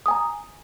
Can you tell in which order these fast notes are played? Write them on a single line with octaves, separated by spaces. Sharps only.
D#6 G#5 A#5